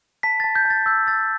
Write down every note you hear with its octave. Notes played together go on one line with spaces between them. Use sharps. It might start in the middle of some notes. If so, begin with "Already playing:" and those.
A5 B6
A6
A5
G6
A5
A6
E6 G6
E6 A6